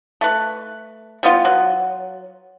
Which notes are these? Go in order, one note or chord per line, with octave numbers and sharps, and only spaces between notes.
A3 B4
G3 B3 F4
F#3